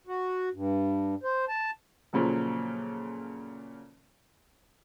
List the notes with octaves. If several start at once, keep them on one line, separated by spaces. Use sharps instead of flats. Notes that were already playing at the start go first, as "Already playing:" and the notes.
F#4
G2
C5
A5
A#2 C#3 F3 F#3 A4